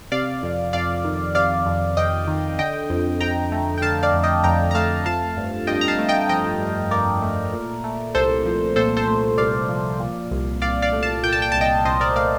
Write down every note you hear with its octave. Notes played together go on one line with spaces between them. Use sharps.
C3 D5 F5
F2
F2 D5 F5
D#3
C3 D5 F5
F2
F2 D#5 G5
D#3
D3 D#5 G5
F2
F2 G5 A#5
A3
G5
D3 F5 A5
D5 F5
F2
D#5 G5
F2 G5 A#5
A#5
A3 F5 A5
F3 F5 A5
G2
G2 D#5 G5
A#5
F5 A5
A3
D#5 G5
F3 D#5 G5
G2
G2 A#4 D5
A3
A#2
A3
C2 A4 C5
F3
A#2 A4 C5
A4 C5
A3
C2 D5 F5
F3
A#2
C2
C2 D5 F5
D5 F5
A3
F5 A5
A#2 G5
A5
G5
C2 A5
D#5 G5
C2 C5 D#5
A#4 D5
A3 D5 F5